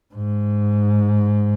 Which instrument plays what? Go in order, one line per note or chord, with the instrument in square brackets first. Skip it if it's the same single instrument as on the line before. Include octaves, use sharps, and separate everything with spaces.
[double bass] G#2